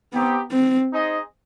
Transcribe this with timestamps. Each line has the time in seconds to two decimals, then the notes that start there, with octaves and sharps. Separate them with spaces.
0.13 B3 C4 D#4 G4
0.51 C4
0.92 D#4 G#4 C5 D#5